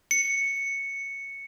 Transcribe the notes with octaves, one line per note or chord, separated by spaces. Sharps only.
C#7